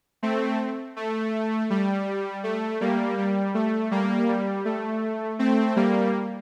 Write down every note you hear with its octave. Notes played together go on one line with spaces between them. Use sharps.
A3 C4
A3
G3
A3
G3 A#3
G3
A3
G3 A#3
G3
A3
A3 C4
G3 A#3